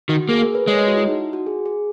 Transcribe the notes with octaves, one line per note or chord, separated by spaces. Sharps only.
D#3 F#4
A#3 G#4
A#4
B4
G#3 C#5
D#5
F#4
E4
D#4
F#4
G#4
G#4